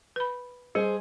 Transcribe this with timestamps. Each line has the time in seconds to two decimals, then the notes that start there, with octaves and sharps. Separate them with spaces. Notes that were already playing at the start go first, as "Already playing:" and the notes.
0.16 B4 B5
0.75 G3 G#4 C5